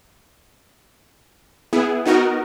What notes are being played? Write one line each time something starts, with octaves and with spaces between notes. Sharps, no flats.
B3 E4 G#4
B3 D#4 F#4 A#4